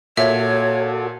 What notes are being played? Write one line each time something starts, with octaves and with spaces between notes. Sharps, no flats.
A#2 F#4 A4 C#5 E5